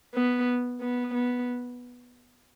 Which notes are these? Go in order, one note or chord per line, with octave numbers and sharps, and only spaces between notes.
B3
B3
B3